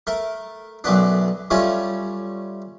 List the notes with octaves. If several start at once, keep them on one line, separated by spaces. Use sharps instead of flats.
A3 A#4
B1 F#2 A3 B3 D4
G3 A3 C#4 F4 C#5